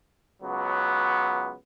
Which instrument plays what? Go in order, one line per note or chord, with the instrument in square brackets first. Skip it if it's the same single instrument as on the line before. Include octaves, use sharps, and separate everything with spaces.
[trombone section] C#2 F#3 B3